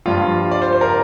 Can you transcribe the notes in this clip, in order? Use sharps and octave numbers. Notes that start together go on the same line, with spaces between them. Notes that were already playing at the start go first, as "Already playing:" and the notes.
G2 F3 F4
D5
C5
C5
A#4